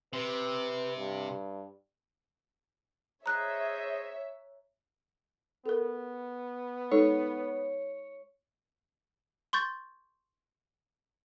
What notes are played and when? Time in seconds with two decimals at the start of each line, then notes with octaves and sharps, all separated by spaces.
0.13 C3 B4
0.97 G2
3.26 G#4 C5 C#5 D#5 E5 A#5 F#6
5.66 B3 A4 A#4
6.92 G#3 D#4 A4 C#5
9.53 C6 C#6 G6 A6